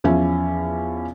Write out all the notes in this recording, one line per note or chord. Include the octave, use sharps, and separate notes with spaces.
E2 F3 C#4 E5 G#5